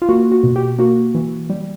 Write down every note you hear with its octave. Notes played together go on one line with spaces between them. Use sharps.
F4
A#3 F#4
F#4
B2
G4
A#3 F#4
E3
G3